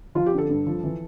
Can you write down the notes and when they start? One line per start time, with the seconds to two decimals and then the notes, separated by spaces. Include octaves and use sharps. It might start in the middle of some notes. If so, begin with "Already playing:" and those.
0.15 F3 F4
0.26 G4
0.33 D3
0.38 A4
0.49 G2
0.67 F3
0.83 E3